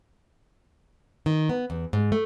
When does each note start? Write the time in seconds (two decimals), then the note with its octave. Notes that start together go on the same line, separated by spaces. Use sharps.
1.26 D#3
1.49 B3
1.70 E2
1.93 G#2
2.12 A3